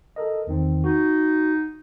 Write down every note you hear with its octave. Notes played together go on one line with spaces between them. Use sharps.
A4 A#4 D#5
E2 D#3 C4
D#4 F#4